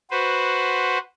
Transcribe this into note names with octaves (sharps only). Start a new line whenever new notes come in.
F#4 B4 C5